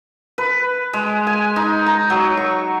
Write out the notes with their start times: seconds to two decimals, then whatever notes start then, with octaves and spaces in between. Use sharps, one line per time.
0.38 B4
0.93 G#3
1.27 G#5
1.56 D#4
1.86 A#5
2.10 F#3
2.37 C#6